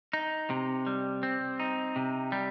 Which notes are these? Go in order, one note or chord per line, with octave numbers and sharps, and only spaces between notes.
D#4
C3
G3
C4
D#4
C3
G3